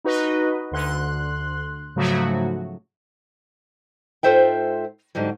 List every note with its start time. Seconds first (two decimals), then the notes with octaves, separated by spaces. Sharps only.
0.05 D#4 F#4 B4 D#5
0.71 D2 D3 C6 F#6
1.96 G#2 C#3 F3 F#3 A3 F#4
4.23 G#2 F4 A4 C5 E5 G5
5.15 G#2 D3 F#3 G3